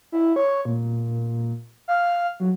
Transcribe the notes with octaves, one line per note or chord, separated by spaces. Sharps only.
E4
C#5
A#2
F5
F#3